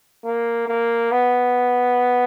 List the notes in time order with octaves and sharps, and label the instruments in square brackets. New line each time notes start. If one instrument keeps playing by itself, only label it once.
[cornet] A#3
A#3
B3